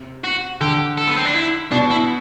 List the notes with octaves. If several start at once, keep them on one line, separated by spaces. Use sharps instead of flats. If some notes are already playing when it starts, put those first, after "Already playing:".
Already playing: C3
F#4
D3 G4
A4
B3
C4
D4
E4
B2 D4
E4